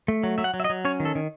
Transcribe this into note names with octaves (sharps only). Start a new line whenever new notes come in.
A3
F#3
F#3 E5
F#5
F#3
E5
D#5
F#3
C#4 C#5
D#3
A4
D#3